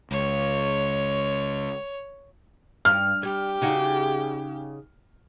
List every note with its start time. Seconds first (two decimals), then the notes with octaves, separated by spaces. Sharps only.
0.11 C#2 C#5
2.85 G2 F6
3.23 G3 G4
3.62 C#3 D#4 F#4